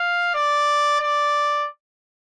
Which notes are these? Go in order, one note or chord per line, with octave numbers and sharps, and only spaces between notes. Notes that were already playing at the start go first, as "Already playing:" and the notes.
Already playing: F5
D5
D5